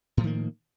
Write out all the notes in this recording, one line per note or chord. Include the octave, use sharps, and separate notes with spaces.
A2 D#3 F3 A#3